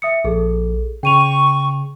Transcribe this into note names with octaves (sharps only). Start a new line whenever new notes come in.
E5 D#6 C#7
A#1 G#4 A4
C#3 G5 C#6 D#7 F7